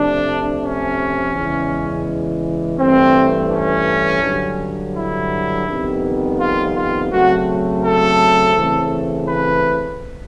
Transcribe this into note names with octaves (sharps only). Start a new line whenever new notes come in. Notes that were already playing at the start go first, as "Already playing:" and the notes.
Already playing: C3 F3 A3 D4
C#4
E2 C#3 E3 G#3
G2 E3 A3 C4
C#4
G2 D3 F#3
E4
F2 C3 D#3 G3 B3
F4
F4
C#3 F#3 A3 C4 F#4
A4
C#3 E3 A3 C4
B4